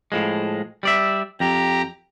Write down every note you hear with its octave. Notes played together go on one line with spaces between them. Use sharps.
A2 F3 G#3
G3 D5 E5
F2 G4 A#5